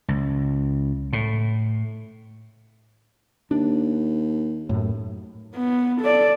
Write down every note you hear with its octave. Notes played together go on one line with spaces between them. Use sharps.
C#2
A2
D#2 D4
F#2 A2
B3
A4 D5